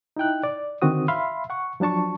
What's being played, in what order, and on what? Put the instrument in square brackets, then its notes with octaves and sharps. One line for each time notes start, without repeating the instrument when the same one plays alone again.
[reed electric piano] D#4 E4 G5 F#6
D5
D3 D#3 C4 F#4 D#6
E5 F5 B5 C6
F#5 C#6
F3 F#3 D4 A5 C#6